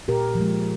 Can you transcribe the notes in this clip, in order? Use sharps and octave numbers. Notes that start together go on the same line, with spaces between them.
A#2 G4 A#4
F3
G#3